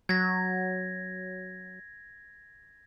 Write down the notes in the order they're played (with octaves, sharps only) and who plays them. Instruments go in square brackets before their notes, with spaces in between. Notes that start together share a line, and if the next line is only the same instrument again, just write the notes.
[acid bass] F#3 [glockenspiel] G#6 A#6